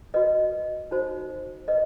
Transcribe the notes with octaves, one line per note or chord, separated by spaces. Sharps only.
F#4 B4 D#5
D#4 F#4 C5
B4 D#5